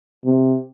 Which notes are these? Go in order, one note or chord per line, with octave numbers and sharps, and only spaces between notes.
C3